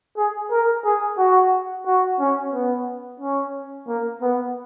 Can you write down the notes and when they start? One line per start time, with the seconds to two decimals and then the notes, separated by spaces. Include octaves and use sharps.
0.18 G#4
0.51 A#4
0.85 G#4
1.18 F#4
1.86 F#4
2.19 C#4
2.53 B3
3.20 C#4
3.88 A#3
4.22 B3